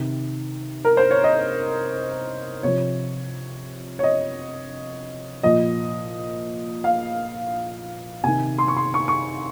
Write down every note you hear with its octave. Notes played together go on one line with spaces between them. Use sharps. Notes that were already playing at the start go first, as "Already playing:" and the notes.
Already playing: C3 D#3
A#4
C5
C#5
D#5
C3 F3 C#5
C#5
D#5
A#2 F3 D#5
F5
C3 D#3 G#5
C6
C#6
C6
C#6
C#6